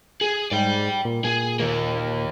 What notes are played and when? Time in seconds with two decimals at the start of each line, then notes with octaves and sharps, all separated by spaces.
0.21 G#4
0.51 G#2 D5 G5
1.05 A#2
1.24 A#2 G#4
1.60 D#3 A#3